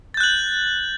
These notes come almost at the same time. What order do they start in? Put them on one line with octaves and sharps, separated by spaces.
A6 G6 F#6 F#7